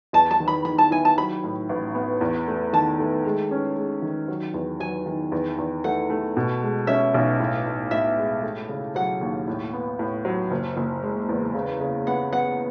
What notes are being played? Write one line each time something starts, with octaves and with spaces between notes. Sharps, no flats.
E2 A5
A5
D#3
B5
D#3 B5
A5
E4 G#5
A5
F#3 B5
A2
A1
B3
E2
A3
D#3 A5
A3
G#3
C#4
G#3
D#3
F#3
E2
F#3 G#5
D#3
E2
E2
A3 F#5
A3
B2
G#3
C#4 E5
B1
A2
A2
A2 E5
G#3
A3
C#3
F#3 F#5
D#2
A2
B3
A2
F#3
F#1
F#1
G#3
E2
C#3
C#3
B3 F#5
B3 F#5